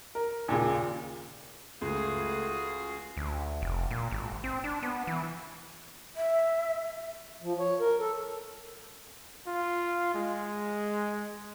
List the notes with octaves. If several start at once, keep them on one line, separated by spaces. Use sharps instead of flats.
A#4
D#2 A#2 C#3
C#2 A3 F4 F#4 G#4
D2
F1
A#2
G#1
C4
D4
B3
E3
E5
F3
C#5
A#4
A4
F4
G#3